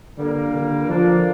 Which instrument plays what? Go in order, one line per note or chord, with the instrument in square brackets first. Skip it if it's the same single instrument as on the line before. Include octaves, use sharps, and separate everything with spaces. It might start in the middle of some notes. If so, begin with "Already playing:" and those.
[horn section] A#2 G3 A#3 [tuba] D3
[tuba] D3
[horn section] D3 A#3 D4 F4 [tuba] F3